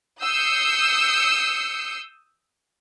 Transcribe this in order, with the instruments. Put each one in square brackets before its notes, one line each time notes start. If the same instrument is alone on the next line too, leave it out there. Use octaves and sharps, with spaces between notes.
[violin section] D#6 E6 G6 C7 C#7